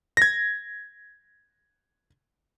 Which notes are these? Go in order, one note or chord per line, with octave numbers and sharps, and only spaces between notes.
G#6 A#6